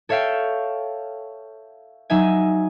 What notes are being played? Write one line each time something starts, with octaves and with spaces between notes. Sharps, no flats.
A4 C#5 E5 F5 G5
F#3 D#4 E5 G#5